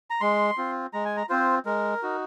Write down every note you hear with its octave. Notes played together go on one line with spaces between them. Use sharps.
A#5
G#3 C6
C4 F4
G#3 A#5
G#5
A#5
C4 F4 C5
G#3 A#4
D#4 F#4